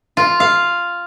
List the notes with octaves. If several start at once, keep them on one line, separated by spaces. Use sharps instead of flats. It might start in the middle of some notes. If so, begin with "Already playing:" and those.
F4
F5